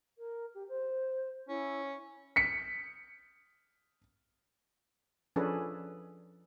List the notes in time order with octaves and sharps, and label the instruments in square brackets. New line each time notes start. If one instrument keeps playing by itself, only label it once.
[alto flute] A#4
G4
C5
[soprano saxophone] C#4 [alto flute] E4
[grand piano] B6 C#7
[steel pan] F3 C#4 D4 G#4 A4 B4